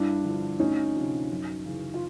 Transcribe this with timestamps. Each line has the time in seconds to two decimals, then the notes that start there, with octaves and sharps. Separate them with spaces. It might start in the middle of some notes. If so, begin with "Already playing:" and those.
Already playing: G2 D4 E4
0.25 D3 F3
0.60 D2 C#4 D#4
0.95 C3 F3
1.30 F#2
1.65 C#3 E3
1.94 F4